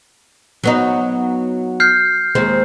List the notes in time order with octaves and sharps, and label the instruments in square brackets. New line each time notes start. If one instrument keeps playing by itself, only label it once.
[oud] F#3 B3 D#4
[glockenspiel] F6 G6 C7
[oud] D#2 G#3 C4